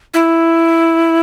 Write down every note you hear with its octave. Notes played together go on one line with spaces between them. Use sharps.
E4